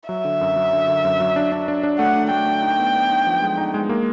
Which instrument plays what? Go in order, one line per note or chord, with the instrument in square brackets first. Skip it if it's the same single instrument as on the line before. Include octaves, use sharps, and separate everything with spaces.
[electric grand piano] F#3 [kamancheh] E5
[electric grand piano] D3
F#2
F#3
D3
D3
F#2
F#3
D4
D4
D4
D4
[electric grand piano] A3 [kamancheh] F#5
[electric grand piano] D4
[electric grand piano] A3 [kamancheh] G5
[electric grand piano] D4
D#4
B3
B3
D#4
F3
G#3
D#4
G#3
A#3